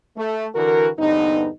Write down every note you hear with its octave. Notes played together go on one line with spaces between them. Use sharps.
A3
D3 E3 F#4 A#4
E2 G2 D3 B3 C4 D#4